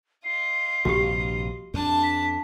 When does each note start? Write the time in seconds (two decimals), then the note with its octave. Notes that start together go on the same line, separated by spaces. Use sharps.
0.24 F4 D#5 C7
0.85 A#1 G2 C3 F#4 G4
1.74 F2 D4 A5
2.03 B6